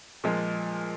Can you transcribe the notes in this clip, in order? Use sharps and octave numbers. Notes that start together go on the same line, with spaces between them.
A#2 F3 G#3